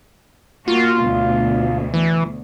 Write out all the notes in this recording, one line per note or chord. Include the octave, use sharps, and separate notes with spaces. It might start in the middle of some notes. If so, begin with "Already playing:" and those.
A#3 F4 F#4
D2 B2
E3